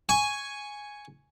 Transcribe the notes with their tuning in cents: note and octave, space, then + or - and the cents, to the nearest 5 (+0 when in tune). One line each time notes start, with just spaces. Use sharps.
G#5 +0 C#6 +5